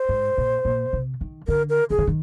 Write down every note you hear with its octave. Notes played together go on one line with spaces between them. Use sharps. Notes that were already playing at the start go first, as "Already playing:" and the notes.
Already playing: C5
G#2
A#2
A#2
C3
D#3
D3 A#4
A#4
D#3 G#4
D3
D#3